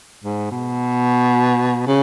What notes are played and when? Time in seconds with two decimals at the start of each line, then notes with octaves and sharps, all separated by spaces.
0.24 G#2
0.51 B2
1.87 C#3